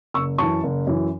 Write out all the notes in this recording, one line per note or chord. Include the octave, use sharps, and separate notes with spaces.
F#1 C#6 E6
F#2 E3 A5 C#6
F#1
F#2 E3